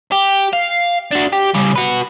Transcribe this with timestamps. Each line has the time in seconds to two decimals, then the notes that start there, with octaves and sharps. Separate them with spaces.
0.12 G4
0.53 F5
1.11 D4 F#4
1.33 G4
1.55 C#3 G3
1.76 F#4 B4